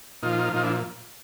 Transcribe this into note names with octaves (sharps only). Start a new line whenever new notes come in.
A#2 F3 D#4 F4
A#2 F3 D#4 F4
D4 E4